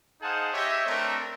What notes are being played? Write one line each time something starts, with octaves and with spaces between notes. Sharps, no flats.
D#4 G#4 C5 F5 F#5 A5
G4 C#5 D#5 E5
A3 C4 D4 A4 A#4